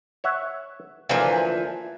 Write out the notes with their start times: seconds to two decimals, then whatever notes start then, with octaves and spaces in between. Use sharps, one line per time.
0.24 C#5 E5 F#5
1.09 D2 A#2 E3 F3